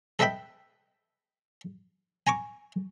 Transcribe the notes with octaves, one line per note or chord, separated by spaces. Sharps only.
A4 B4 D#5 E5 G5 B5
G#5 A#5 C#6 D6